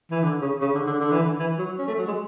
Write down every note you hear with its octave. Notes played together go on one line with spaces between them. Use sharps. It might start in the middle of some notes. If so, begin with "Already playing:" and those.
E3
D3
C#3
C#3
D3
D3
D3
E3
D3
E3
F#3
C#4
A3
F#3
G#3